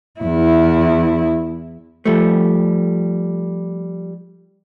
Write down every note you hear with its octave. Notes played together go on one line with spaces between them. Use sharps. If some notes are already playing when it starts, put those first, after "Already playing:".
E2 E4
F3 G3 A3